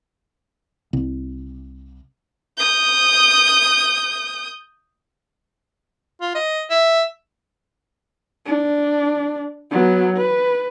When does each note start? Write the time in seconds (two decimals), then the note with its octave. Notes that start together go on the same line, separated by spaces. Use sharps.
0.93 C2
2.58 D#6 G6
6.21 F4
6.35 D#5
6.71 E5
8.46 D4
9.71 F#3 B3
10.17 B4